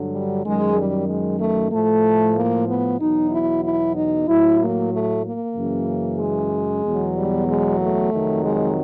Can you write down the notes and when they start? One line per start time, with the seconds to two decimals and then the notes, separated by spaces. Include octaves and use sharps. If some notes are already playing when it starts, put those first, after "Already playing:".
Already playing: G2 D3 F#3
0.11 G3
0.44 F#2 D#3 F#3 G#3
0.76 G3
1.08 G#3
1.40 A3
1.72 A2 F3 A3
2.36 A#3
2.68 B3
2.99 E2 B2 F#3 D#4
3.31 E4
3.63 E4
3.96 D#4
4.27 A2 F#3 E4
4.59 A#3
4.91 A3
5.24 A#3
5.55 F#2 C#3 E3
6.19 G#3
6.83 E2 B2 F#3
7.15 G3
7.47 G#3
7.79 A3
8.12 F2 C3 D#3 F#3
8.43 G#3